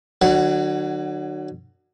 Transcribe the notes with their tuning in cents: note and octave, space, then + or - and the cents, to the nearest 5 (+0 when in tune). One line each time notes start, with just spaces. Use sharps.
D3 +40 F#3 +0 F#5 +15